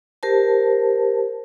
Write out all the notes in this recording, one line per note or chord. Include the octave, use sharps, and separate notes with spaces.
G4 A#4 C5 A5